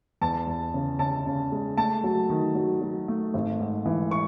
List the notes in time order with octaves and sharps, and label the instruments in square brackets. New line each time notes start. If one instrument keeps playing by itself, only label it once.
[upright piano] E2 A5
E2
C#3
C#3 A5
C#3
G#3
A3 A5
F#3
D#3
F#3
F#3
A3
G#1
G#2
E3
C#6